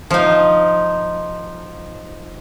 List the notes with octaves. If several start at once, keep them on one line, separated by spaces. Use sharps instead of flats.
F3 D#4